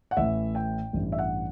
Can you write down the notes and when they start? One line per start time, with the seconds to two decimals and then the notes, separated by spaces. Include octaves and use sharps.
0.11 F#5
0.17 A1 A2 E3 E5
0.55 G5
0.93 A1 G2 E3
1.12 E5
1.18 F#5